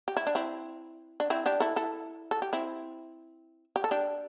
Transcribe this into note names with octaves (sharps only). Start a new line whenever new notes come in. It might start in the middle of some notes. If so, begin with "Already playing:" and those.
G4
E4
D4
C4 E4
D4
C4 E4
D4 G4
E4 A4
E4 A4
A4
G4
C4 E4
G4
A4
D4 G4